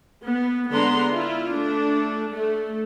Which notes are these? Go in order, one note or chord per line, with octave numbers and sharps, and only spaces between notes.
B3
D3 G#3 B3 D4 A#5 C6
E4 F4
A3 D4
A3